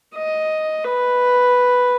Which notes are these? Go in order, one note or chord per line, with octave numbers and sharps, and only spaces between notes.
D#5
B4